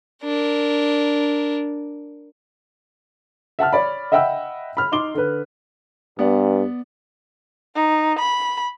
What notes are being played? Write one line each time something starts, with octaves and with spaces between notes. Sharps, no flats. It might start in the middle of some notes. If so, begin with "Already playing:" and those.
D4 A#4
E5 F#5 A5 F6
C#5 D5 B5
D#5 E5 F#5 G5 B5 E6
B5 F6
D#4 C6 D6 G7
D3 B4
G2 B3 D5
D#4
B5